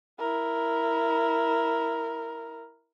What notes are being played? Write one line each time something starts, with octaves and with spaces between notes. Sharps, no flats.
E4 A#4